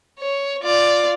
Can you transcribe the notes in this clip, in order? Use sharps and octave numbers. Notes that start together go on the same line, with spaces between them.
C#5
F4 D5